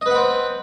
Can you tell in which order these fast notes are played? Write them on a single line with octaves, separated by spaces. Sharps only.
D#5 B4 F#5 C4